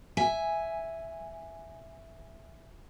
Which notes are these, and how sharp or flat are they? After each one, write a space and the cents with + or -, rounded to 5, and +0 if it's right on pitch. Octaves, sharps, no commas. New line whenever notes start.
E5 +0 G#5 +0